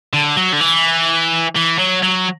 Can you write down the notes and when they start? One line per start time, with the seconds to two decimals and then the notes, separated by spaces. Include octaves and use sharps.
0.13 D3
0.37 F#3
0.53 D3
0.61 E3
1.56 E3
1.79 F#3
2.03 F#3